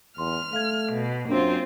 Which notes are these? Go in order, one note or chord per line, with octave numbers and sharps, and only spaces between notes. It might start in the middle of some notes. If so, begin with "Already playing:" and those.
E2 C6 F6
A3 F5 G#6
B2
F#2 A#3 C4 D4 F4 F#4